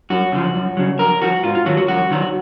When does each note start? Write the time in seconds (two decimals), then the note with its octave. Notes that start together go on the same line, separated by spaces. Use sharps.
0.10 F#2 F#4
0.32 C#3 F3
0.55 F#2
0.77 C#3 F#3
0.99 F2 A#4
1.22 F3 F#4
1.44 G#2 F4
1.55 F4
1.66 D#3 F#3 F#4
1.77 F#4
1.88 F2 F#4
2.11 D#3 F#3